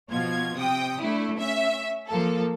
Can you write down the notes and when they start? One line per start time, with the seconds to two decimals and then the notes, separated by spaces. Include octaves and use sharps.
0.11 B2 F3 F4 G#6
0.57 C3 G5 D#6
1.01 A3 D4 E4
1.39 C#4 E5
2.08 F3 A#3 A4